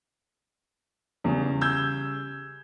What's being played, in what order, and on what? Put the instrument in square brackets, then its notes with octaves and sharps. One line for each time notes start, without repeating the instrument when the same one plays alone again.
[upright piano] E2 [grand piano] C#3 G3
[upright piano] E6 G6 G#6